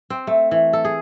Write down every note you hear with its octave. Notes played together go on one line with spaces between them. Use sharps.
C4
A3
E3
A4
G#4